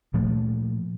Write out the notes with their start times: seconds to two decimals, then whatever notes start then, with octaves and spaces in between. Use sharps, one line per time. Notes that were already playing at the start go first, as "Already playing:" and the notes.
0.14 A#2 F3 A3